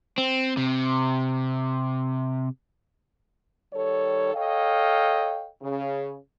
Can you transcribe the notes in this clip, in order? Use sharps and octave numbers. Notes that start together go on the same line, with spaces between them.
C4
C3
D#3 G3 A4 C#5
A4 C#5 D#5 F5 G5
C#3